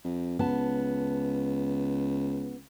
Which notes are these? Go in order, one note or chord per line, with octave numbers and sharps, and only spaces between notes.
F2
C#2 B3 A5